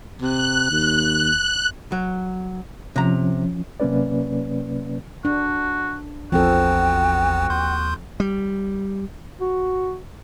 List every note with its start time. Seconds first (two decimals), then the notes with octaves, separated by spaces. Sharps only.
0.21 C3 F#6
0.70 D#2
1.92 F#3
2.96 C3 F3 C#4 A#5
3.80 C3 F#3 A#3 C#4 B4 D5
5.25 D4 F#4
6.32 A1 E2 F3 C4 F#4 A4 G5
7.50 D#2 C6 G6
8.20 G3
9.41 F#4